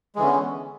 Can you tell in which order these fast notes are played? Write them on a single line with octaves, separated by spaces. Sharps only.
G#3 E3 D3 C#4 B3